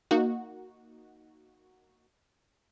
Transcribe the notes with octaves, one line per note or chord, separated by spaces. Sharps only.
A#3 D#4 F#4